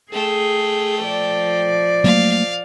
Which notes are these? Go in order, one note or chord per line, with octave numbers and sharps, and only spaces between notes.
A3 G#4 G5
F3 D5
F#3 A3 A#3 F5